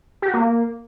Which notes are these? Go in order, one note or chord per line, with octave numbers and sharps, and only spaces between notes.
G4
F#4
A#3